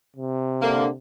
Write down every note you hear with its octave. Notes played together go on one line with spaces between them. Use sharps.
C3
D3 A#3